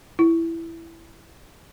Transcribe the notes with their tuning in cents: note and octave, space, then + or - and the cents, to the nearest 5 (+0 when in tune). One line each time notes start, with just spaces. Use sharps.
E4 +10